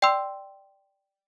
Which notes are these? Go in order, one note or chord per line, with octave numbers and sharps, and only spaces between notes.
D5 G5 C6 E6